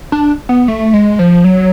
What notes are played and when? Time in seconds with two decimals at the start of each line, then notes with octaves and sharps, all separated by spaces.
0.12 D4
0.49 B3
0.68 A3
0.94 G#3
1.19 F3
1.44 F#3